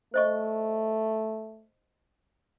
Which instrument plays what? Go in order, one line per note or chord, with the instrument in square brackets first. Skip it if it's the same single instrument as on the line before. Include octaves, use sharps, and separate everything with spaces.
[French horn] A3 [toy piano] C5 D#5 C#6